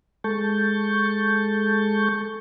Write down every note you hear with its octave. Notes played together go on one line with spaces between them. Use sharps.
G#3 A4 A5 C#6 G6